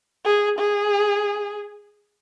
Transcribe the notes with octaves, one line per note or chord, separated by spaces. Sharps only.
G#4
G#4